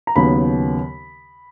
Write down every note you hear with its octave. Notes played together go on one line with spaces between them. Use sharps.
A#5
D#2 C#3 F#3 B3 B5